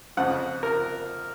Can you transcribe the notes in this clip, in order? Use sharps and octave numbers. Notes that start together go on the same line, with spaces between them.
F2 C#3 F3 F#5
A#4